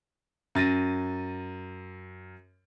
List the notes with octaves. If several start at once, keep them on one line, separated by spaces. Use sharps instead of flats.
F#2 A6 A#6 D#7